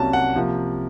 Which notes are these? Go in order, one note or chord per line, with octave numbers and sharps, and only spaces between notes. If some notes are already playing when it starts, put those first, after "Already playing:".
Already playing: C2 C3 F#3 A#3 C#4 A5
F#5
C3 F3 A#3